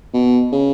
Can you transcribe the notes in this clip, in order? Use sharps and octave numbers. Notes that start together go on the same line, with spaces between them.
B2
C#3